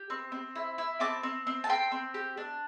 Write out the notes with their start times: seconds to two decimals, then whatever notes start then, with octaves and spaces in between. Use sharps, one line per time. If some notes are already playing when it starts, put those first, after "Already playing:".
Already playing: G4
0.10 C4
0.32 C4
0.55 E4
0.78 E4
1.00 C4 A5 D6
1.23 C4
1.47 C4
1.64 A5
1.69 C4 G5 C6
1.91 C4
2.14 G4
2.37 D4